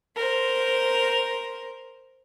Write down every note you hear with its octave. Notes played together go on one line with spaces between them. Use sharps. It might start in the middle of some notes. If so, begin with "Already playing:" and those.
A#4 C5